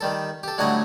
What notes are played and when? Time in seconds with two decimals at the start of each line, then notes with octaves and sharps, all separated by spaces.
0.01 D#3 G3 A4
0.43 G4 A4
0.58 A2 D3 F#3 G3 C#5 D#5